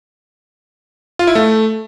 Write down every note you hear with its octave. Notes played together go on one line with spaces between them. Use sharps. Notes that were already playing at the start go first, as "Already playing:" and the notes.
F4
E4
A3